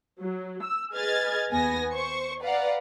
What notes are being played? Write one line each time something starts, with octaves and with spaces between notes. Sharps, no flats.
F#3
E6
G#4 B4 D#5 F6 G#6 A6
D#2 B3 G#5 A#6
C5 C#6
B4 D5 F5 F#5 A#5